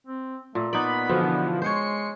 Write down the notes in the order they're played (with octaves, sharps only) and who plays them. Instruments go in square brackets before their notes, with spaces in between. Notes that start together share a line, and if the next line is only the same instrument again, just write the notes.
[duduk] C4
[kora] A#2 [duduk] A3
[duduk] B3 [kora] D#4 D5 [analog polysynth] B5
[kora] B2 [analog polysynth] D3 E3 F3
[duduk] G#3 [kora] C5 C#5 [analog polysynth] C7 C#7